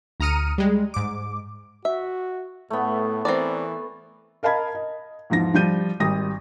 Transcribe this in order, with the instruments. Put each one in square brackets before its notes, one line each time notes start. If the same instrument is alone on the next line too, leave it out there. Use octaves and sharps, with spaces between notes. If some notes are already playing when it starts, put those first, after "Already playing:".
[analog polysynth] D2 A#5 D#6 F6 C#7 D#7
G3 G#3
G#2 D6
[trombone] F#4 [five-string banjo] E5
[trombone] A2 [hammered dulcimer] A3 B3
[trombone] E3 [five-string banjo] C4 A#4 D5
[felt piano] A#4 D#5 F5 A5 B5 G#6
D#5
E2 G#2 F3 A#6
F3 G3 G6 D#7
G#1 G3 D#6 A#6